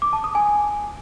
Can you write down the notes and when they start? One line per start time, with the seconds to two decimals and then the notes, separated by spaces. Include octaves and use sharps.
0.02 D6
0.13 A5
0.24 D#6
0.35 G#5